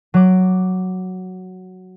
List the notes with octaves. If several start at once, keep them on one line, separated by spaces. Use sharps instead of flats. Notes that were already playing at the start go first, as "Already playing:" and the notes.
F#3 D6